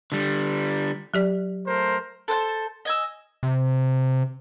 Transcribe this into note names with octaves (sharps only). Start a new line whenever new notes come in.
D3 G3
F#3 G4 D5
A3 A#4 C5
A4 C5 F#5 A5
D#5 G#5 E6
C3